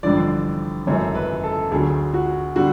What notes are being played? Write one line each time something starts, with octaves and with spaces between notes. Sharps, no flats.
A1 G2 D3 F3 D5
G#1 F#2 C#3 E3 A3 C#5
B4
A4
D2 D3 F#3 G#4
F#4
D3 G3 F#4